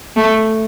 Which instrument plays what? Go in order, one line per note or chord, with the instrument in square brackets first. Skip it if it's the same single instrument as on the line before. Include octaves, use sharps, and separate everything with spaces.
[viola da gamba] A3